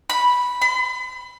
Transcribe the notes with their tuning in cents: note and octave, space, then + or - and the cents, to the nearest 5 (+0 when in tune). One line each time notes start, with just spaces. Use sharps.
B5 -5
B5 +45